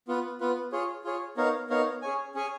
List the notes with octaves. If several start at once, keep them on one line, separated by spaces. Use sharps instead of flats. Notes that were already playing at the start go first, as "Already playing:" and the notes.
B3 F4 B4
B3 F4 B4
F4 G#4 C#5
F4 G#4 C#5
B3 D#4 A#4 C#5 F5
B3 D#4 A#4 C#5 F5
C#4 G#4 C#5 G#5
C#4 G#4 C#5 G#5